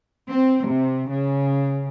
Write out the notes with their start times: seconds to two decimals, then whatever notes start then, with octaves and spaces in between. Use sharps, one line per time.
0.29 C4
0.66 C3
1.10 C#3